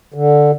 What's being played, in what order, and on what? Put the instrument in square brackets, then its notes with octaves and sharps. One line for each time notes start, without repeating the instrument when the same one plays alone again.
[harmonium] D3